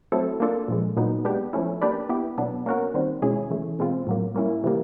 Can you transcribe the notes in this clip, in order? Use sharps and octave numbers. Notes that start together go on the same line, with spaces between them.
F#3 A3 C4 E4 A4
A#3 D4 F4 A4
A#2 F3 G#3
A#2 F#3 B3 D#4
G#3 B3 D4 G4
F3 A3 C#4 E4
A#3 D4 G4 B4 D5
B3 E4 G4
B2 F#3 B3 D4
A#3 C#4 F#4 A#4
D#3 G3 C4
B2 G#3 C#4 E4 G#4
C#3 E3 A3
B2 G#3 C4 F4
A2 F#3 A#3
G3 A#3 C#4 E4
C3 E3 G3 A#3